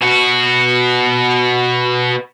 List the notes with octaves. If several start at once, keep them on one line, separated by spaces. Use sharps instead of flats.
B2 F#4